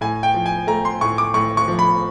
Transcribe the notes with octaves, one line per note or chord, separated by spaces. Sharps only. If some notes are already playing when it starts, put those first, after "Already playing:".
A2 G#5
G5
F3
G#5
A3 A#5
C6
A2 C#6
D6
A2 C#6
C#6
F3
B5